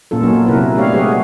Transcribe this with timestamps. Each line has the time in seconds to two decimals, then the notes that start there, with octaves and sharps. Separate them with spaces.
0.11 A#2 A#3 C#4 F4 A4
0.23 F#3 A#3 B3 C#4 D#4 C#5
0.46 C3 E4 A#4 B4
0.76 A3 B3 D4 G4 C#5 F5
0.93 F#3 G#3 G4 G#4 B4 C#5
1.07 F#4